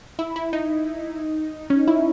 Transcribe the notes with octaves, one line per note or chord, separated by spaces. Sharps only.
E4
E4
D#4
C#4
E4